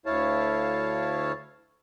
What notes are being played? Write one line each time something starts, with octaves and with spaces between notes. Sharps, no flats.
D2 E4 C#5 F5 A5